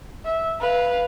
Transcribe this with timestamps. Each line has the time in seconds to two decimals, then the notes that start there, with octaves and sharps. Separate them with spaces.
0.25 E5
0.60 B4 F5